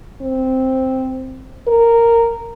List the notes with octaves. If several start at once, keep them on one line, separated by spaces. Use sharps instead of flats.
C4
A#4